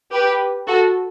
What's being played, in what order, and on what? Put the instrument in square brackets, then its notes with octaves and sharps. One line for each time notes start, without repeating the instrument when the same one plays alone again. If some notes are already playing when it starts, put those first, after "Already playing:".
[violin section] G4 B4
F#4 A4